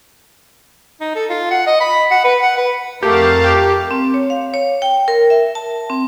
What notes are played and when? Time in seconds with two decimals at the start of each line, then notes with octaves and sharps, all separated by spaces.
1.01 D#4
1.15 A4
1.30 F4
1.51 F#5
1.67 D#5
1.81 B5
2.10 F#5
2.24 B4
2.42 F#5
2.58 B4
3.03 F2 A3 G4 A#4 F5 A5
3.44 G4
3.91 C4
4.14 C#5
4.30 F5
4.54 C#5
4.82 G5
5.08 A#4
5.30 E5
5.55 A5
5.90 C4